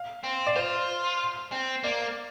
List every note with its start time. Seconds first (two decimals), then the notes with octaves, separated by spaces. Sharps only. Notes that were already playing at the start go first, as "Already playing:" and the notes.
Already playing: F5
0.24 C4
0.47 D5
0.56 F4 C5
1.52 C4
1.83 A#3 D5